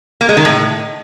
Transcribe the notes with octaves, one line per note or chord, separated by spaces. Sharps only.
A#3
G#3
D#3
A2